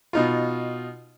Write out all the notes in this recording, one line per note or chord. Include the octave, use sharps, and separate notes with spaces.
B2 D#4 F4